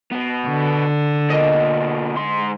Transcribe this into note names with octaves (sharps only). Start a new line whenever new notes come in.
B2 B3
D3
B2 A#3 D#5
G#2 C6